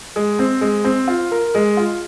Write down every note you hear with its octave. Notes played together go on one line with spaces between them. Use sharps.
G#3
C4
G#3
C4
F4
A#4
G#3
F4